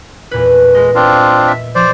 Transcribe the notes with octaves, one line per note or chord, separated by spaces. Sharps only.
E2 A#2 B4
G#3 D#5
C4 D4 F4
E5
F3 C5 D5